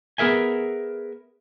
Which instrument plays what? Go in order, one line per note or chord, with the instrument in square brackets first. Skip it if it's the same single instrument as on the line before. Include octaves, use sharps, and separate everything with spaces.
[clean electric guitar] B3 G#4 A#4 E5 G#5